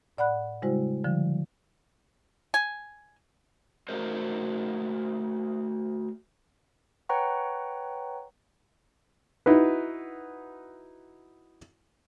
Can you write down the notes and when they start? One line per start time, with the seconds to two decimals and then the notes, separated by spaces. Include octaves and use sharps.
0.18 A2 D5 F#5 B5 F#6
0.62 C#3 G3 G#3 E4 F#4 C5
1.04 D3 F3 G3
2.54 G#5
3.89 A3 F#4 A#4 C5
7.09 B4 C#5 F#5 G5 A#5 C#6
9.46 D#4 E4 F#4 B4